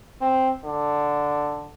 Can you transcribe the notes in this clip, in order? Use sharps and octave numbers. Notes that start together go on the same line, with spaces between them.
C4
D3